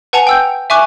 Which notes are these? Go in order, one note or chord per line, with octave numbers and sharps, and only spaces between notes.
B4 F#5 G#5 A5 C#7 F7
G5 E6 G6
E5 G#5 C#6 D6 F#6